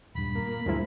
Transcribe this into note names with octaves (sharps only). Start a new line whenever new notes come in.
D#1 G2 B5
A#3
A#2
D2 G2 F3 G#3 A#3 E4